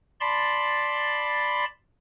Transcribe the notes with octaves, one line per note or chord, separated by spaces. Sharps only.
D5 A5 B5 C6